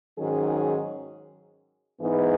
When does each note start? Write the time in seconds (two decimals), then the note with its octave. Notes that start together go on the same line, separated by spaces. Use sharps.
0.18 G#2 D#3 F#3 C#4 G#4
1.99 G#2 E3 B3 D#4 G#4